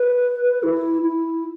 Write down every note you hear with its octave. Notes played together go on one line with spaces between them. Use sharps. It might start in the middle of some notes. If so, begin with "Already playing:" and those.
Already playing: B4
E4
E4